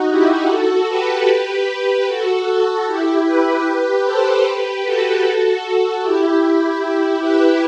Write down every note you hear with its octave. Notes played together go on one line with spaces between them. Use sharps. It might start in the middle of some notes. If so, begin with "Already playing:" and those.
Already playing: D#4 F#4
E4 G4
F#4 A4
G4 B4
G4 B4
F#4 A4
F#4 A4
E4 G4
G4 B4
A4 C5
G4 B4
F#4 A4
E4 G4
G4 B4